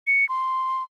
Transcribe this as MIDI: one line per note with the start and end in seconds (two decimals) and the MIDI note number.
0.07 0.27 97
0.29 0.83 84